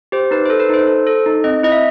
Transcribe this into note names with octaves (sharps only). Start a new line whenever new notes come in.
G4 C5
D#4 B4
A4 C5
B4
D#4 C5
A4
A4
D#4
C4 D#5
E4 D#5
E5